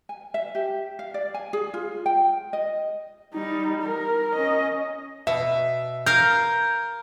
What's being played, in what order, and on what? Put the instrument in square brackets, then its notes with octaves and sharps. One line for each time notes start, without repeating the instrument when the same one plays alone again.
[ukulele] G#5
E5
G4
F5
D5
G#5
G#4
F4
G5
D#5
[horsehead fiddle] G3 D#4
A#4
C#4 D#5
[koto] B2 [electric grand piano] E5
[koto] A#4 F5 [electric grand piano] G6